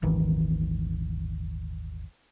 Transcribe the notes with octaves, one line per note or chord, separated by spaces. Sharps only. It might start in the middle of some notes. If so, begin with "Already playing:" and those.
D#1 G#1 D#3 E3